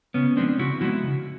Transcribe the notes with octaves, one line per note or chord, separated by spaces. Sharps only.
C#3 B3 C#4
F3 G#3 B3 C4 D4
C#3 E4 F#4
F3 G#3 B3 E4 F#4
C#3